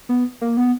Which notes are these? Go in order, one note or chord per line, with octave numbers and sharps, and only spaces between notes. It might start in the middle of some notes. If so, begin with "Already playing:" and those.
B3
A#3
B3